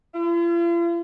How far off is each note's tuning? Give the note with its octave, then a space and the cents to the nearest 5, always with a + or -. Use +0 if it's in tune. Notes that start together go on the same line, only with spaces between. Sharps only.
F4 -45